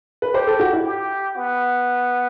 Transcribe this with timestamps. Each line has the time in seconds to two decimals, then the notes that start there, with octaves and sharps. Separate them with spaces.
0.22 B4
0.34 G4 C5
0.47 A4
0.60 F#4
0.73 E4
0.85 G4
1.36 B3